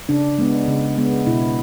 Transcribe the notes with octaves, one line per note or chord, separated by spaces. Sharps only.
C#3 D4
G#3 B3
C#3
G#3 B3
B2 E4